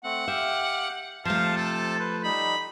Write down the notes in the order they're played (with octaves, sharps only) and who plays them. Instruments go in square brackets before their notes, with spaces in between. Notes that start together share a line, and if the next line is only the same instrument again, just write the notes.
[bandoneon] A3 C4 [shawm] F#5
[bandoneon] G4 F5 G5 [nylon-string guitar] E5
[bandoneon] C3 C5 A5 [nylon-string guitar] F3 A3 [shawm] F5
[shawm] A4
[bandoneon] B4 C5
[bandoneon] G3 D#4 [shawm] B5